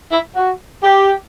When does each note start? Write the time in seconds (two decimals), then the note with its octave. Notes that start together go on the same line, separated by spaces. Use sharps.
0.12 E4
0.36 F#4
0.83 G4